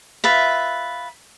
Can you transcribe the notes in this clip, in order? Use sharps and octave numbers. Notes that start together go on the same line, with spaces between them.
F4 B4 E5